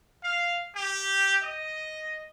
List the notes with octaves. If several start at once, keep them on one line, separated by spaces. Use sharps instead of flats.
F5
G4
D#5